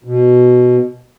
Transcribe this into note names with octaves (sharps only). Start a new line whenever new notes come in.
B2